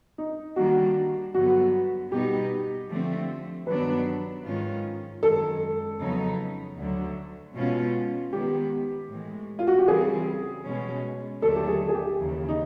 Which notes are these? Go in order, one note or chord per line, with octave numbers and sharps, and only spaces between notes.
D#4
D#3 G3 A#3 D4 F#4
G2 D3 F#3 B3 F#4
B2 G3 B3 D#4 G4
D3 F3 A3 C4
G2 D#3 F#3 B3 D4 B4
G#2 D#3 G#3 C#4 F4
F#2 D#3 G#3 A4
F2 C#3 F#3 B3 D#4
D2 D3 F#3
B2 G#3 C#4 F4
D#3 G#3 B3 G4
A2 E3 G#3
F4
F#4
G4
C#3 E3 G3 C4 G#4
B2 G#3 C#4
D#2 D3 F#3 A3 D4 A4
G4
G#4
G#4
G4
D#2 C#3 E3
D#4